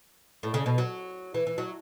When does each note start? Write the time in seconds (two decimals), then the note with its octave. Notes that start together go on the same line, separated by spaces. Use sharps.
0.43 A2
0.54 C#3
0.66 B2
0.78 F#3
1.34 E3
1.47 E3
1.58 F#3